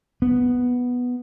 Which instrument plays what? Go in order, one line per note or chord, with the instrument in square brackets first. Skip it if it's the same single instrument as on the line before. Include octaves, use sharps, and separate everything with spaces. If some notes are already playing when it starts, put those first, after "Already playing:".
[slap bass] B3